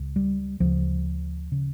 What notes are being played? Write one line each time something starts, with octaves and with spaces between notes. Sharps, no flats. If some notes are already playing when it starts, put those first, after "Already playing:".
Already playing: C#2 C#3
G3
D2 C#3 F3
C#3